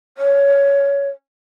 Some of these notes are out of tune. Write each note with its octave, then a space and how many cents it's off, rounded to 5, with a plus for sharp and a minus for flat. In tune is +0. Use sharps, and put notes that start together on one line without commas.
C#5 +15